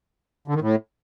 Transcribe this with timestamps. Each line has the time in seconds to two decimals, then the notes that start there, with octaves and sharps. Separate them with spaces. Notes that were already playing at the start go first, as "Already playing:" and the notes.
0.48 D3
0.55 D#3
0.61 A2